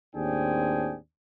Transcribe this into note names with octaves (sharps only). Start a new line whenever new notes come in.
D#2 A2 C4 D4 G#4 G5